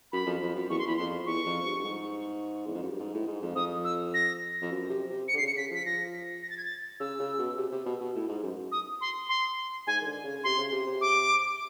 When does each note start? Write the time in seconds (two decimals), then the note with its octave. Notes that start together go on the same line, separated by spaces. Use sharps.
0.12 F#2 B5
0.26 F2
0.42 F2
0.55 F#2
0.70 E2 C#6
0.79 C6
0.86 E2 B5
0.96 F2 C6
1.26 E2 C#6
1.46 F2
1.65 G2
1.79 G2
1.84 G#2
2.66 E2
2.74 F2
2.83 F#2
2.91 G2
2.99 G#2
3.14 A2
3.27 G#2
3.41 F2
3.56 F2 D#6
3.84 E6
4.14 A#6
4.62 F2
4.71 F#2
4.89 C3
5.10 C3
5.28 C#7
5.34 D3 C7
5.42 C#3 C#7
5.57 C#3 B6
5.71 F3 B6
5.86 F3 A#6
6.43 A#6
6.50 A6
6.57 G#6
6.65 A6
7.00 C#3 E6
7.19 C#3
7.38 B2
7.57 C3
7.72 C3
7.85 B2
8.00 B2
8.15 A2
8.28 G#2
8.43 F#2
8.72 D#6
9.01 C6
9.29 C6
9.87 G#2 G#5
10.01 D#3
10.06 D3
10.24 C#3
10.44 C3 C6
10.58 C#3
10.72 C3
10.86 C3
11.01 D6